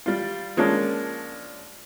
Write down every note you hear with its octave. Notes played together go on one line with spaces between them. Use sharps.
G3 F4
F3 G#3 A#3 C#4 D4